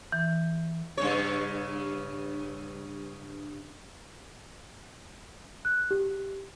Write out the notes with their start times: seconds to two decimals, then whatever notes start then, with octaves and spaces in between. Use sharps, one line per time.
0.12 E3
0.97 G2 C#3 C#5
5.65 F#6
5.91 G4